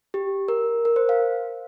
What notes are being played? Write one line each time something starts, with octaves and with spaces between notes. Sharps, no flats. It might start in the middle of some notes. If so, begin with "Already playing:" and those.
G4
A#4
A#4
C5
F5